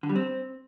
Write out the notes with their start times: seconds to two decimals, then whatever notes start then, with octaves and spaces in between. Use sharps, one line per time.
0.03 D3
0.09 G3
0.16 C4